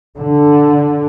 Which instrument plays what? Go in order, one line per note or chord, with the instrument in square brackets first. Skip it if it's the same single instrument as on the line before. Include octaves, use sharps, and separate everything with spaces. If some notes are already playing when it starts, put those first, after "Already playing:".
[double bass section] D3